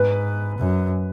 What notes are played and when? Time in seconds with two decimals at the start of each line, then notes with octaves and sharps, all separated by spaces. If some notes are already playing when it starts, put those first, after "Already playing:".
Already playing: G#2 B4
0.59 F#2